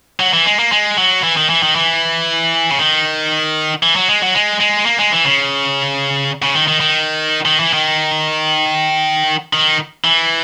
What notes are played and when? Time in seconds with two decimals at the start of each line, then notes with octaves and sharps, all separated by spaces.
0.20 F#3
0.33 E3
0.46 G#3
0.59 A#3
0.72 G#3
0.97 F#3
1.23 E3
1.37 D#3
1.50 E3
1.63 D#3
1.75 E3
2.70 C#3
2.79 D#3
3.83 E3
3.96 F#3
4.09 G#3
4.22 F#3
4.35 G#3
4.60 G#3
4.86 A#3
4.99 G#3
5.12 E3
5.25 C#3
6.43 C#3
6.55 D#3
6.68 D#3
6.80 D#3
7.45 D#3
7.60 E3
7.73 D#3
9.53 D#3
10.04 E3